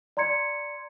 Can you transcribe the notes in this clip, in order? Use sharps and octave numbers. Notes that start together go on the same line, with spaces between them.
D5 A#5 C6 G#6 C#7